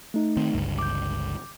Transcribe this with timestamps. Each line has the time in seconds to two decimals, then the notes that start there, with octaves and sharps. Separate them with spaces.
0.14 A3 D#4
0.37 D#3 C4
0.54 G1 C#2 G2
0.79 D6 G6